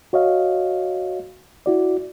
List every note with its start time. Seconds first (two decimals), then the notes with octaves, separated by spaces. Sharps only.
0.13 F#4 C#5 D#5 F5
1.66 E4 F#4 D5